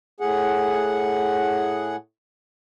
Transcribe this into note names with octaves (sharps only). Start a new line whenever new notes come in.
A2 G#4 F#5